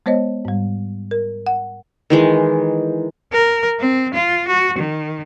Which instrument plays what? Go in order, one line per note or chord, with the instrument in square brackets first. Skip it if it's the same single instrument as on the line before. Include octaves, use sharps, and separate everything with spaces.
[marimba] G#3 B3 C5 C#5 D#5
G#2 G3
A#4
F#5
[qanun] D#3 E3 G#3
[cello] A#4
C4
F4
F#4
D#3